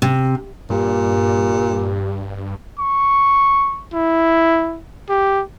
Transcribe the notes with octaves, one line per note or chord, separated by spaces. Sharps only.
C3
G2 A#2 G4
C#6
E4
G4